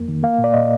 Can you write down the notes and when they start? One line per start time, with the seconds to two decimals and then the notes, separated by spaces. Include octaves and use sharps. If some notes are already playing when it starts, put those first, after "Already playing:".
Already playing: F2 A#3
0.08 D#3
0.23 A#3 F5
0.38 A#2
0.44 D5
0.54 A#2 D#5